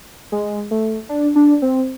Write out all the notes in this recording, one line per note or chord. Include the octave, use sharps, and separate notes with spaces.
G#3
A3
D4
D4
C4